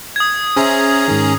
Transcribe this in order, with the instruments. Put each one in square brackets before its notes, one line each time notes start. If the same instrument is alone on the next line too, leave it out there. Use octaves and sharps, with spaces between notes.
[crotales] D#6 G#6
[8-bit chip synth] C#4 G#4 A#5 [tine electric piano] C5 E5
[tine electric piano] G#2 D#3